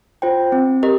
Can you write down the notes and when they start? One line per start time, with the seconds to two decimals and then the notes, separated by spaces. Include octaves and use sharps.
0.22 F4 C5 G5
0.52 C4
0.83 G4 A#4 D#5